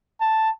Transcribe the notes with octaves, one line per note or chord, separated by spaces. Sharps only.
A5